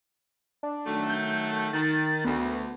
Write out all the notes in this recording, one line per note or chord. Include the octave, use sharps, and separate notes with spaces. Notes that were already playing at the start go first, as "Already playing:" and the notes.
D4
D#3 F#3 A3
G6
D#3 A6
D2 B3